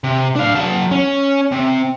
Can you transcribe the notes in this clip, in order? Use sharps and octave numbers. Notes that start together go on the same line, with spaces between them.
C3
D4 F5
F#3 A5
C#4
C3